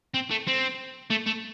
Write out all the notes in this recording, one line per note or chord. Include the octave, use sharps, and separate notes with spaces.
C4
A3
C4
A3
A3